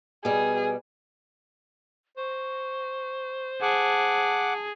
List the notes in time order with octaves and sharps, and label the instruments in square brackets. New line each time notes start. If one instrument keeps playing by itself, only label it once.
[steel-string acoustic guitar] B2 G3 [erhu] G#4
[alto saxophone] C5 [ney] C#6
[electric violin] G#4 [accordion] F#5 D6 [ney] A5